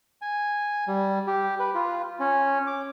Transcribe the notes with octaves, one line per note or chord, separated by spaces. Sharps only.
G#5
G3
G4
B4
F4
C#4
D6